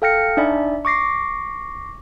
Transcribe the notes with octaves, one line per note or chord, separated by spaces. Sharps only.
A4 F5 G5 F6 A#6 C#7
D4 D#4 D5 E5 G#5 B5
C#6 D6 A#6 C7